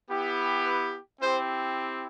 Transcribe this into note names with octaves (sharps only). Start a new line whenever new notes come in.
B3 E4 G4
B4
C4 E4 G4 C5